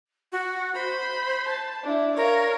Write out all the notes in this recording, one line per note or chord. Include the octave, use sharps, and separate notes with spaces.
F#4
C5 B5
A5
D4 E4
A#4 C#5 F5